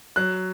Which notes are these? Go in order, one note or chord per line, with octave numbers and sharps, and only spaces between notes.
F#3 F#6